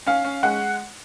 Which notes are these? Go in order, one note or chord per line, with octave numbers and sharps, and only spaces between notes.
C#4 F5
C#4
G#3 F#5